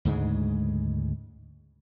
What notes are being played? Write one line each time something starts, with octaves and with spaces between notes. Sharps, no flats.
D2 G#2 C#3 G#3